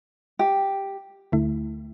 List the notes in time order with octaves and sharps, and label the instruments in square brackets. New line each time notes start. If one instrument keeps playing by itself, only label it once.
[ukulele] G4
[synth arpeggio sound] D2 D3 A3 E4